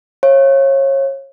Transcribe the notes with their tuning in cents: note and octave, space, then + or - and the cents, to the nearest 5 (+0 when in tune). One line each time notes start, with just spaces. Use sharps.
C#5 -30 F5 -30